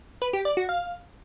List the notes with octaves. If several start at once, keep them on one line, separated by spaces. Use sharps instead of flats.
B4
G4
D5
F#4
F5